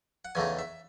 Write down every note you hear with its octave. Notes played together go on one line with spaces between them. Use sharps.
F#5
E2 C#3 E3 A3 D#4 G#5
E5